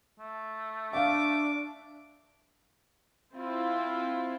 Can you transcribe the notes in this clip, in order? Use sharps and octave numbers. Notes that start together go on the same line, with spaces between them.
A3
D4 E5 F5 D6
C4 E4 F4